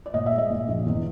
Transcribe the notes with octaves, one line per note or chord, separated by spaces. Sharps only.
D5
A#2 D#5
E5
G#3
D#5
A#2
A#1
E2